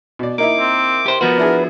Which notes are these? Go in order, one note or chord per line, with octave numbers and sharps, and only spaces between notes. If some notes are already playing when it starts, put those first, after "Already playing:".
B2 D5
A#3 D#4 E4 D6
C4
G4 C5
F3 B3 F#4 A#4 B4
D4 E4 G#4